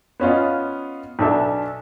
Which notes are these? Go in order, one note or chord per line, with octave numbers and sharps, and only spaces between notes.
B3 C#4 F4 D#5
B1 D4 A4 E5